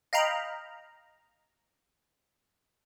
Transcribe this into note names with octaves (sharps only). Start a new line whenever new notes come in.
D#5 F5 G5 A#5 B5